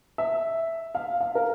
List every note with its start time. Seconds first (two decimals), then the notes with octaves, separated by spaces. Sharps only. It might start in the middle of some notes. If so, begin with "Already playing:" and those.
0.18 E5
0.95 F5
1.20 F5
1.35 A#4